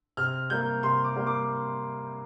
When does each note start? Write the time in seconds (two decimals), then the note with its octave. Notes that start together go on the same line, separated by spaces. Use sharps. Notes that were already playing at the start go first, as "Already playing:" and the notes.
0.17 C3 F6
0.50 G3 A#3 G6
0.83 C3 C6
1.04 D6
1.16 G3 A#3
1.27 D6